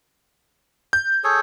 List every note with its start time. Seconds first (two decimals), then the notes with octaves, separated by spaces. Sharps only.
0.93 G6
1.24 G#4 A4 C#5